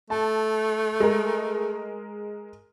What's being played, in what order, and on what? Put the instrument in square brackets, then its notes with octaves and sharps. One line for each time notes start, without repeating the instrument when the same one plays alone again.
[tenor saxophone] A3 [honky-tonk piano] A5
[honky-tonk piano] G#3 A#4